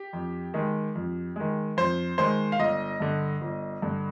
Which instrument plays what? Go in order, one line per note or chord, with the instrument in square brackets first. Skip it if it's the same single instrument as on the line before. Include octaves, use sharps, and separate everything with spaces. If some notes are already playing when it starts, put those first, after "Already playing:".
Already playing: [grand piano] G4
F2
D#3 G#3
F2
D#3 G#3
F2 C5
D#3 G#3 C5
F5
G1 D#5
G2 D3
G1
G2 D3